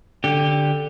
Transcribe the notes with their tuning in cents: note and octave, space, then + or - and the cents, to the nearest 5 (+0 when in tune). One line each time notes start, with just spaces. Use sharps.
D3 +0 G4 +5